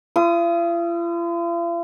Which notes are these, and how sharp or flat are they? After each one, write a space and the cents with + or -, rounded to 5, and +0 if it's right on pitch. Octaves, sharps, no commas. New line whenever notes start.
F4 -45 D#6 +15